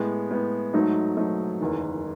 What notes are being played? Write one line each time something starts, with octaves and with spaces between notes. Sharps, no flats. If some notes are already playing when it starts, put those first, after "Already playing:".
Already playing: A2 G#3 B3
A2 G#3 B3
G#2 F#3 A3 D#4
G#2 F#3 A3 D#4
F#1 E2 D#3